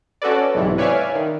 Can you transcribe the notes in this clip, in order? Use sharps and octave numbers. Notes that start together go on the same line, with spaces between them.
C#4 F#4 A4 B4 D5
B1 G#2 C3 E3
B4 C#5 D5 E5 F5 G#5
D#3